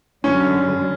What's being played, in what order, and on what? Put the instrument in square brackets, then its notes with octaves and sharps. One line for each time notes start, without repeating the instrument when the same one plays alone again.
[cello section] F#2 D3 G3 [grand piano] C#4